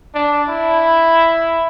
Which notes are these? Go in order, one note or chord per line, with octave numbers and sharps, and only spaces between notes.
D4
E4